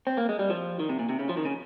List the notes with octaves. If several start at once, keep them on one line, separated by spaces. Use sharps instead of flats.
C4
A#3
G#3
G3
F3
D#3
C3
A#2
C3
C#3
F3
D#3
C#3